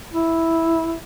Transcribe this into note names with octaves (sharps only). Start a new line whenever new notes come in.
E4